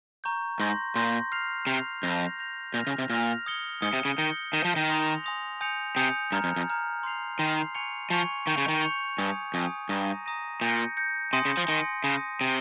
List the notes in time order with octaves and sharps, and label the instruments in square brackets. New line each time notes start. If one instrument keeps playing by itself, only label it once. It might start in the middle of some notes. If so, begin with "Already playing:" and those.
[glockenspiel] A#5 C#6 G6
[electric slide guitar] G#2 [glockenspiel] C6 G6 A#6
[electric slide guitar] A#2 [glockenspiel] C6 G6 A#6
[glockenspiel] F6 C7 F7
[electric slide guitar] C3 [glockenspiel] F6 C7 F7
[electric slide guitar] F2 [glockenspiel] G6 A#6 F7
[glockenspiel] G6 A#6 F7
[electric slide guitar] A#2 [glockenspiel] F6 A#6 F7
[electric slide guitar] C#3
C3
[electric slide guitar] A#2 [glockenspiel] F6 A#6 F7
[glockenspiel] D#6 G#6 C#7 G7
[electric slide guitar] G#2 [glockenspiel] D#6 G#6 C#7 G7
[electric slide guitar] C3
C#3
[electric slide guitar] D#3 [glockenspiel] G6 A#6 C#7 G7
[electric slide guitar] D#3 [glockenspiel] G6 A#6 C#7 G7
[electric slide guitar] F3
D#3
[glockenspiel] G#5 C6 D#6 A#6 F7
G#5 C6 D#6 A#6 F7
G#5 D#6 G6 C#7 F7
[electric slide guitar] C3 [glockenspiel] G#5 D#6 G6 C#7 F7
[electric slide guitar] G2 [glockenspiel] A#5 F6 G#6
[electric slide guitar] F2
F2
[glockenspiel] A#5 F6 G#6
C6 F6 C7 F7
[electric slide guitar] D#3 [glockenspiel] C6 F6 C7 F7
[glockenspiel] G#5 C#6 G#6 C#7 F7
[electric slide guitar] F3 [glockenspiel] G#5 C#6 G#6 C#7 F7
[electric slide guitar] D#3 [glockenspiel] C#6 G6 C#7 F7
[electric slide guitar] C#3
D#3
[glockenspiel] C#6 G6 C#7 F7
[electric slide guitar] G2 [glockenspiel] G#5 D#6 G#6
[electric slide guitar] F2 [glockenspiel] G#5 D#6 G#6
[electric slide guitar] G2 [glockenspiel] A#5 D#6 A#6 D#7
[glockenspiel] A#5 D#6 A#6 D#7
[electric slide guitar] A#2 [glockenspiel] G6 A#6 C#7
[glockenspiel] G6 A#6 C#7
[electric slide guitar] C3 [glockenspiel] G#5 C6 D#6 A#6 C#7
[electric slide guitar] C#3
F3
[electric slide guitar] D#3 [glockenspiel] G#5 C6 D#6 A#6 C#7
[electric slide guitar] C#3 [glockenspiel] D#6 A#6 D#7
[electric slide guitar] C3 [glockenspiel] D#6 A#6 D#7